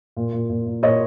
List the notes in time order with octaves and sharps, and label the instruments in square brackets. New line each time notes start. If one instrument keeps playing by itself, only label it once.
[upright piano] A#2
A#2
A#2
A#2
A#2 C#5 D#5